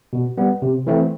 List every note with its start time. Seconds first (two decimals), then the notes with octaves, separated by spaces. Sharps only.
0.13 B2
0.38 G3 B3
0.62 C3
0.87 E3 A3 C4